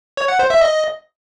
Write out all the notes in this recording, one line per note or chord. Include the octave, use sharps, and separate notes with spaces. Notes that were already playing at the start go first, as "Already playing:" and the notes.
C#5
F#5
C5
E5
D#5